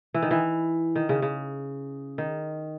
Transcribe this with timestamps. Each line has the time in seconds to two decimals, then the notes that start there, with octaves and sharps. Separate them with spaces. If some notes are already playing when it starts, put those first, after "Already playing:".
0.14 E3
0.22 D#3
0.31 E3
0.96 D#3
1.09 C#3
1.22 C#3
2.18 D#3